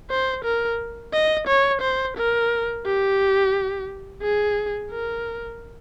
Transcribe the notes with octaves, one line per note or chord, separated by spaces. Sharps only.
C5
A#4
D#5
C#5
C5
A#4
G4
G#4
A#4